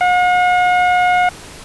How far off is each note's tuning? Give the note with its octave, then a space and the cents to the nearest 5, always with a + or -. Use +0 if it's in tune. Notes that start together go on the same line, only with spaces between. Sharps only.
F#5 -45